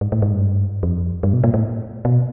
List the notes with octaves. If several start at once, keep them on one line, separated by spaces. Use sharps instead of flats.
G#2
A2
G#2
G2
F2
G2
B2
A#2
A2
B2